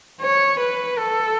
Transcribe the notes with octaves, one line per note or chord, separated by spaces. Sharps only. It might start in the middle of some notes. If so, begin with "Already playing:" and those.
C#5
B4
A4